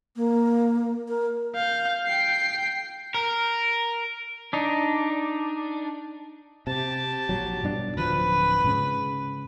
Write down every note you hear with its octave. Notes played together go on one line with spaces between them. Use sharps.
A#3
A#4
F5 G6
G5 C7
A#4
D4 D#4
C3 G4 A5
A#1 F#3
G2 B2 D4
D1 D3 F3 B4
G#2 C#3